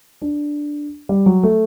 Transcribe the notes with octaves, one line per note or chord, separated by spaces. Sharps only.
D4
G3
F#3
A3